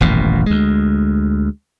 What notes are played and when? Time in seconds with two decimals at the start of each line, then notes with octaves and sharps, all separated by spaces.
0.01 D#1 A1 F#2 B2
0.46 D2 G#3